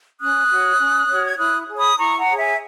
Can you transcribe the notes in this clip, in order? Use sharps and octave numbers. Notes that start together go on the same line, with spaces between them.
C#4 D#6 F#6
F#4 C#5
C#4
F#4 C#5
G#6
E4 D#6 F#6
G#4 C#5
B5 D#6
E4 A#5 C#6
F#5 A#5
G#4 C#5
E5 G#5